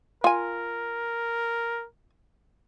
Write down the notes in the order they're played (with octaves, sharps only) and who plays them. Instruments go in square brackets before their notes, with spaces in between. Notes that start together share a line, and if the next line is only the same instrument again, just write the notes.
[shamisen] F4 G#5 [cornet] A#4